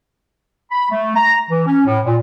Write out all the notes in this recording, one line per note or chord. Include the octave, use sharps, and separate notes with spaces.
B5
A3
A#5
E3
C#4
A2
A#2